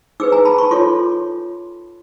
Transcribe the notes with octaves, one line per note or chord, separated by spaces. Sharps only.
D#4 G#4 B4 D6 E6
G#5 A#5
A5 B5
B5 C#6
F4 A4 C#5 C6 D6